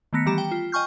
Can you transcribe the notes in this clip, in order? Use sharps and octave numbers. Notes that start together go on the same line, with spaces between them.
D#3 A3 B3 A#6 B6 C#7
E3 G3 G4 A#5 E7
G5
F4
D#5 G5 G#5 C#6 F6 G6